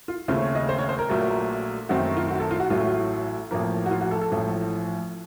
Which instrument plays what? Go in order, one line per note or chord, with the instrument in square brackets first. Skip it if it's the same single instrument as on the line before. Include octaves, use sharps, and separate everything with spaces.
[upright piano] F4
D#2 C#3 A3 C4 F4
C#5
D#5
C5
C#5
C5
A#4
A#1 A#2 F#3 A3
F#2 D#3 A3 C4 F#4
F4
F#4
A4
F4
F#4
A1 A2 F#3 A3 F4
A1 A2 F3 A#3
F#4
F4
F#4
A4
A4
A1 A2 F3